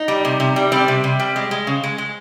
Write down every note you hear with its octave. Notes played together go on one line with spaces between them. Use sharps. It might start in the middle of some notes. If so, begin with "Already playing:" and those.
Already playing: D#4
G3
C3
C3
G3
G3 C4
C3
C3
G3
G#3
G#3
C#3
G#3
G#3